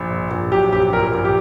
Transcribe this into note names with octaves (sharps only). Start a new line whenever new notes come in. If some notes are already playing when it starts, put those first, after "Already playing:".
Already playing: A#1
A#2
A#1
F#3 G4
A#1 G4
A#2 A#4
A#1
G4